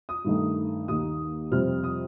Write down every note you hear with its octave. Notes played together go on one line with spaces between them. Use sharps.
D#6
G2 D#3 A3
D#2 D#3 A#3 D#6
F2 C3 G3 C4 F6
D#6